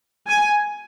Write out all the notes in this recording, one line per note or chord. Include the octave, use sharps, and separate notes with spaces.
G#5